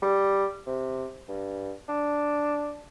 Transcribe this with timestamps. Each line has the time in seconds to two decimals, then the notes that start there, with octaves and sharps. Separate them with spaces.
0.02 G3
0.67 C3
1.29 G2
1.89 D4